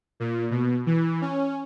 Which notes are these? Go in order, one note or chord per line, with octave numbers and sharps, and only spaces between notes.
A#2
B2
E3
C#4